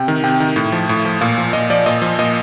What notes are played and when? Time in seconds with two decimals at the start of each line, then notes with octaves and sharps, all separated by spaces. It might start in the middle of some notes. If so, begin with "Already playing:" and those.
Already playing: C3 G5
0.08 D#3
0.24 C3 G5
0.40 D#3
0.56 A2
0.72 F3
0.89 A2
1.05 F3
1.21 A#2 F5
1.38 F3
1.53 A#2 D#5
1.70 F3 D5
1.86 A#2 D#5
2.02 F3
2.19 A#2 D#5